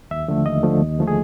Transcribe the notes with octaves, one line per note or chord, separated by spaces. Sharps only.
D#2 E5
D3 F3 A3
D#2 D#5
D3 F3 A3
D#2
D3 F3 A3
G#4